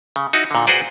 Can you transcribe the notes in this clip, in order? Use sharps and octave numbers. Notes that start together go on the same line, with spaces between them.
C#3
D#4 E4 F#4
A#2 D3
F#4 G#4 B4 C5 D5